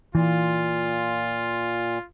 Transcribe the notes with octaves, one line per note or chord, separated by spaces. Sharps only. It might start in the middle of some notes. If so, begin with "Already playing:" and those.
A#2 E3 F4